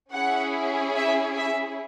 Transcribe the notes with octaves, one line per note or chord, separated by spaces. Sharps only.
C#4 E4 G#4 F#5
E5
E5